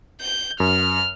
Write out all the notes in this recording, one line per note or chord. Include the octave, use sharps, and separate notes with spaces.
G6
F#2 F6